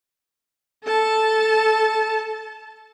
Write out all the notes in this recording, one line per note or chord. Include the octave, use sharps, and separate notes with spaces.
A4 A5